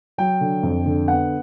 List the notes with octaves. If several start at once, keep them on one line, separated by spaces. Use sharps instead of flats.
F#3 G5
D3
F2
D3
B3 F#5